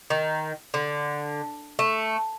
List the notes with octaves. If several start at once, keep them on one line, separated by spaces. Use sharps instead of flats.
D#3
D3
A3